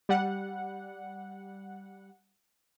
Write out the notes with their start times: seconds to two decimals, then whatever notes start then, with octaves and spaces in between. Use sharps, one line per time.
0.09 G3 F#5